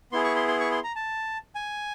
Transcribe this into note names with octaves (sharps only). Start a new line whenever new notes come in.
B3 E4 G#4 C6
C#6
C6
C6
C#6
C6
A#5
A5
G#5